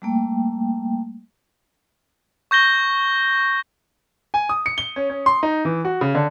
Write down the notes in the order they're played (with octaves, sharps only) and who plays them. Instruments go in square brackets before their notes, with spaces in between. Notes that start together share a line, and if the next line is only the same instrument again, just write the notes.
[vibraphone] G3 A3 A#3 G5
[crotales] C#6 G6 A#6 G7
[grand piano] G#5
D#6
C#7
G7
C#4
C#4
C6
D#4
E3
F#4
C#3
D3